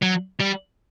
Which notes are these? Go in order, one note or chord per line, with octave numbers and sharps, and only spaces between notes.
F#3
G3